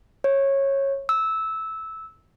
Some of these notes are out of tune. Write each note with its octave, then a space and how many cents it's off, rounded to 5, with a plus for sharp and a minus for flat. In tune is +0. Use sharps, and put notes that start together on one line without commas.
C#5 -15
E6 -15